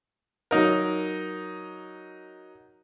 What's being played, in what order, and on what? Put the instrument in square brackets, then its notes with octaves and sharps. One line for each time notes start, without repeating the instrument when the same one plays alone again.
[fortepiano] F#3 D#4 A#4